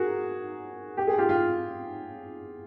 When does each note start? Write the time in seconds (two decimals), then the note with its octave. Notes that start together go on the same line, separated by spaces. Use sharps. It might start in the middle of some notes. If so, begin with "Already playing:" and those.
Already playing: F#4 G#4 A#4
0.97 G4
1.07 G#4
1.18 F4 G4
1.29 F4